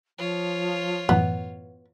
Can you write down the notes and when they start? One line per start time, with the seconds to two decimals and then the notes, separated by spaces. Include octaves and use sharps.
0.18 F3 F4 C#5
1.09 F#2 A2 E3 B3